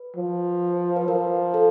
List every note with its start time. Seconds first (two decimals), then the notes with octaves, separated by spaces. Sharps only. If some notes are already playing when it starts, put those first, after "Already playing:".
Already playing: B4
0.16 F3
0.96 B4
1.08 F3 A#4
1.54 A4